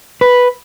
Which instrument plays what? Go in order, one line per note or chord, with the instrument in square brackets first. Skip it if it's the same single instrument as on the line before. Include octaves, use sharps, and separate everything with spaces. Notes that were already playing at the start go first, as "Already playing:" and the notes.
[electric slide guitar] B4